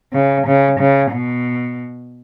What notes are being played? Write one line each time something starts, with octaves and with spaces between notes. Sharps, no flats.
C#3
C#3
C#3
B2